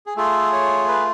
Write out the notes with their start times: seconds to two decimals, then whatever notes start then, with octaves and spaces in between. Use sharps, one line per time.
0.06 G#4
0.16 A3 F4 G#4 A4
0.52 C#5
0.88 B4